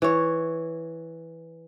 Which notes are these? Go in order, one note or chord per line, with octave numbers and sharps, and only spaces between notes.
E3 C#5